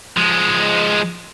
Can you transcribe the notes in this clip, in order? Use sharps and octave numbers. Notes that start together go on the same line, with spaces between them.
F3 G#3